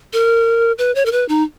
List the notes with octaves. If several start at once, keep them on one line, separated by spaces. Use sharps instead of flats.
A#4
B4
C#5
A#4
B4
D#4